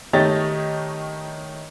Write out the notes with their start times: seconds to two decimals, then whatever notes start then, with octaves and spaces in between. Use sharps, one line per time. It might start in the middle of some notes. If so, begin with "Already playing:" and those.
0.13 D#3 A3 G4 C#5 D#5 A6